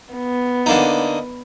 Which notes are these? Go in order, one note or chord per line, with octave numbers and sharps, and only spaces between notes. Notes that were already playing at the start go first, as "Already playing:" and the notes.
B3
D3 A#3 D#4